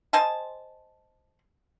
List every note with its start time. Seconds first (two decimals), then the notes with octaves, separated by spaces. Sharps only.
0.13 C5 D#5 G#5 A5